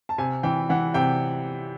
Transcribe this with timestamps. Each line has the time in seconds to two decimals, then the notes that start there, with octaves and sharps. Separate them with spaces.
0.09 A5
0.18 C3 G#5
0.43 E3 G5
0.69 E3 F#5
0.94 C3 G5